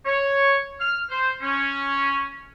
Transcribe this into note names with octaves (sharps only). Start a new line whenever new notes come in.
C#5
F6
C5
C#4